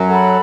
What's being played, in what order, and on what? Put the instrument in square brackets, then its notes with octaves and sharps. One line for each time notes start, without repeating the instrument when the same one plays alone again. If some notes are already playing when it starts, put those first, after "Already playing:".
Already playing: [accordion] F#2 F#3
[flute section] A4 F#5 B5